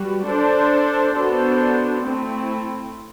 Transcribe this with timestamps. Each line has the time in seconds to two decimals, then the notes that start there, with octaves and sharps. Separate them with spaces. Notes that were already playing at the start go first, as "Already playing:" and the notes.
Already playing: G3 F#4 B4
0.25 D4 A4 C5
1.14 B3 D4 F#4 A4 C5
2.03 A3 C4 E4